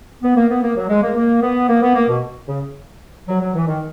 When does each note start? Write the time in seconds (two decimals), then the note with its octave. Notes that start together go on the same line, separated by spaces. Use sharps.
0.22 B3
0.36 A#3
0.49 B3
0.62 A#3
0.76 F#3
0.89 G#3
1.02 A#3
1.15 A#3
1.42 B3
1.68 A#3
1.81 B3
1.95 A#3
2.08 B2
2.47 C#3
3.28 F#3
3.41 F#3
3.54 E3
3.66 D#3